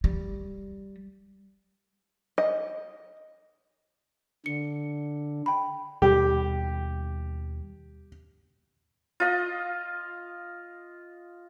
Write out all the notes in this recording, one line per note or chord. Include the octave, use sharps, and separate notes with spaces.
G3
D#5
D3 C#7
G5 B5
D#2 B2 G3 G4
F4 D#5